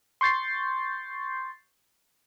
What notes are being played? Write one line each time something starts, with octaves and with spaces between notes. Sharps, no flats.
C6 C#6 G6 A6 C7